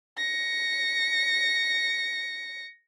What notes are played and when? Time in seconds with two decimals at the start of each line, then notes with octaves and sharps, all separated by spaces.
0.17 A#6 C#7